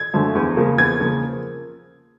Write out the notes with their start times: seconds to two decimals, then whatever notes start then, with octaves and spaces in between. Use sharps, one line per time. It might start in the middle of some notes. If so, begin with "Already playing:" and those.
Already playing: G#6
0.14 F#2 D3 F3 A3
0.35 E2
0.57 C#3 F3 A#3
0.78 E2 G#6
1.00 C#3 F3 A#3